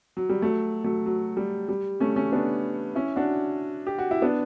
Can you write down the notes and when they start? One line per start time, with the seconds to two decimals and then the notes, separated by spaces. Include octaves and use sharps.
0.17 F#3
0.29 G3
0.42 F#3 A3
0.84 F#3 A3
1.06 F#3
1.37 G3
1.69 G3
2.00 A3 C#4
2.16 A3 C#4
2.32 B3 D4
2.95 C#4 E4
3.16 D4 F#4
3.87 G4
3.98 F#4
4.11 E4
4.22 B3 D4